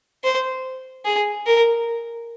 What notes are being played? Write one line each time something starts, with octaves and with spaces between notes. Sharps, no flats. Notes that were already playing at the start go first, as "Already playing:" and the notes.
C5
G#4
A#4